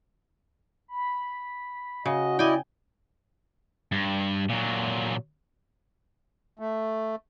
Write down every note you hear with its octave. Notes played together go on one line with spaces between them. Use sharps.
B5
C#3 F#4 D#5
E4 D5 D#5 G5 G#5
G2
A#2 F#3
A3